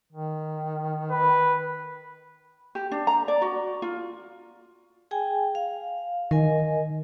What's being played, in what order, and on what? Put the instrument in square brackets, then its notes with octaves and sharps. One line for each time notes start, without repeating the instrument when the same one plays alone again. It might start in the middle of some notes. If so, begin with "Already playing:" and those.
[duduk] D#3
[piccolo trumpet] B4
[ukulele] G4
D4
A#5
D5
F#4
F4
[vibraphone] G#4 G5 G#5
F5
[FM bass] D#3 [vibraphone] A#4 D#5 G#5